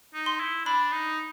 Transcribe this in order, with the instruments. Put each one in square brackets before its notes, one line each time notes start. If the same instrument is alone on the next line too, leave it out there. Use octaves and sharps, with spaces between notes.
[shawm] D#4
[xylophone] C6
[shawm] E4
[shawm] D4 [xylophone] B5
[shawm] D#4